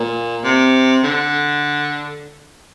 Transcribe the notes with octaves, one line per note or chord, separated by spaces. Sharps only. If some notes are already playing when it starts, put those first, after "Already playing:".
Already playing: A#2
C3
D3